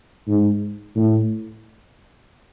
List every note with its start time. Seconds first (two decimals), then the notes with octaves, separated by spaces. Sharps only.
0.27 G#2
0.96 A2